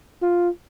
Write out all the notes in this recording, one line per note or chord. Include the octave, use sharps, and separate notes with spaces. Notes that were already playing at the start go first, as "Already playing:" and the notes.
F4